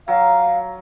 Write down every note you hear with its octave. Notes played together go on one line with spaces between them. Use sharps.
F#3 F5